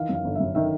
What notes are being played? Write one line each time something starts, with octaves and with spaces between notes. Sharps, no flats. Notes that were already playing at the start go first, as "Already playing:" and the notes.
Already playing: D#3 E3 F5
F#2
F5
G1
F#2 E5
D#3 E5